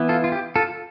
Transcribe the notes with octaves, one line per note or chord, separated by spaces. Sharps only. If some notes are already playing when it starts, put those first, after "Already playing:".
Already playing: E3 B3 E4
F4 A4
F4
G4
F4 A4